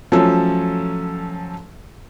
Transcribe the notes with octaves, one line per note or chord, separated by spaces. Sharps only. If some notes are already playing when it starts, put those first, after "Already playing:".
F3 F#3 A3 C#4 A4